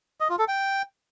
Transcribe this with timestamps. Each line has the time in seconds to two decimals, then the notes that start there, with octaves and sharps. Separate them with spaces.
0.21 D#5
0.30 F4
0.39 A4
0.48 G5